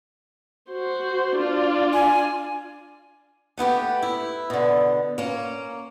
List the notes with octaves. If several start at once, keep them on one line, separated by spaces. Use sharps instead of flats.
F#4 C5
D4 F4
G#5
A3 B3 E4 G4
E4
B2 D3
A#3 C#4